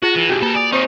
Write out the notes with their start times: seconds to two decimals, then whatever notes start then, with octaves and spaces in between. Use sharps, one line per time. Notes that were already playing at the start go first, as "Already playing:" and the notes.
0.02 F4 F#4 G#4 A#6
0.16 E3
0.29 C2 G#2 F#4 G4
0.42 A#3 A4 A#4
0.55 D5 G#5 D#6 F7
0.72 C4 D#4 F4 C5